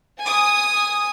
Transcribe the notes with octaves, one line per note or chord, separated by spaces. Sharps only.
G#5 D#6